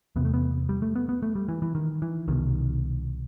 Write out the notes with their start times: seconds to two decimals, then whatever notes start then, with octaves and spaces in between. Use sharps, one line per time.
0.16 E2 C3 B3
0.25 A3
0.34 B3
0.69 G3
0.82 A3
0.96 B3
1.09 B3
1.23 A3
1.35 G3
1.49 E3
1.62 E3
1.75 D#3
2.02 E3
2.28 C2 B2 D#3